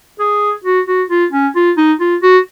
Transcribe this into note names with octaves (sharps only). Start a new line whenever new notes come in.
G#4
F#4
F#4
F4
C#4
F4
D#4
F4
F#4